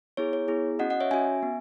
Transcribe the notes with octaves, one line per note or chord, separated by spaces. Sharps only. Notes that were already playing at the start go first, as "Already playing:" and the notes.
B3 E4 G#4 C#5
C#5
B3 E4 G#4
C#4 F#4 D#5 F#5
D#5 F#5
C#5 E5
C#4 F#4 E5 G#5
B3